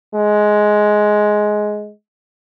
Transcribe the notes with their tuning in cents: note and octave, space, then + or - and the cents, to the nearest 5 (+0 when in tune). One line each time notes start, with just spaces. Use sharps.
G#3 +10